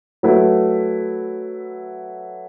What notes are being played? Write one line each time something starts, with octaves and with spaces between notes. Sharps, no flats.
F#3 A3 E4 B4